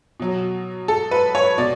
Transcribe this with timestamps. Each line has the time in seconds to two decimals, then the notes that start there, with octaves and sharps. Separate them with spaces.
0.20 B2 F#3
0.88 A4
1.11 B4
1.35 C#5
1.58 B2 D5